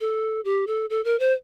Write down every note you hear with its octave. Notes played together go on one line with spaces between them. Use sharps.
A4
G4
A4
A4
A#4
C5